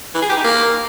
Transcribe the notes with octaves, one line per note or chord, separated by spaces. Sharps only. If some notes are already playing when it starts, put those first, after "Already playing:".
E3
G#4
G4
D#4
A#3